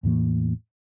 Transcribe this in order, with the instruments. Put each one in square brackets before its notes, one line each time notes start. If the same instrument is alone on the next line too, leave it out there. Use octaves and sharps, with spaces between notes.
[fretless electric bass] E2 A2 E3 A#3